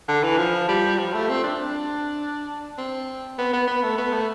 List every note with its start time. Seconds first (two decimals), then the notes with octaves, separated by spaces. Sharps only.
0.08 D3
0.24 E3
0.38 F3
0.69 G3
0.98 F3
1.14 A3
1.29 C4
1.44 D4
2.78 C4
3.38 B3
3.53 B3
3.67 B3
3.83 A3
3.98 B3
4.13 A3